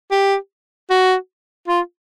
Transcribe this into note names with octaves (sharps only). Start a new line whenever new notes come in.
G4
F#4
F4